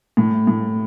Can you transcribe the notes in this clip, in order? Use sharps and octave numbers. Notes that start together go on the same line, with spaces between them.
A2
A2